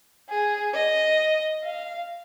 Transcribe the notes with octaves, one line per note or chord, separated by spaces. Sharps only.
G#4
D#5
F5